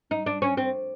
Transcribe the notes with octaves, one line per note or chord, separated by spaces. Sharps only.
D#4
D4
C#4
C4